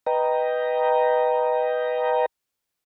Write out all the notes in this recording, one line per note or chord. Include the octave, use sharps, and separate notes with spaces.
B4 D#5 G5 A#5